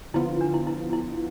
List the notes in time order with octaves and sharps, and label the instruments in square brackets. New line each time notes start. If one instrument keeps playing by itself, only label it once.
[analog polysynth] D3 F3 B3 F4 [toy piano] E4
[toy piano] D4
E4
E4
E4